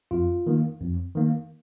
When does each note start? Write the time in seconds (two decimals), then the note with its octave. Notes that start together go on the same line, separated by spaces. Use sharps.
0.11 F2 F4
0.46 D#3 A#3
0.81 F2
1.15 D#3 A#3